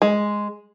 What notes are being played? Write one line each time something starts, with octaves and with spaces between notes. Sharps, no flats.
G#3